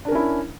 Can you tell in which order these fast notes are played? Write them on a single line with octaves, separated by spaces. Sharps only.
D4 A#4 C#4 E4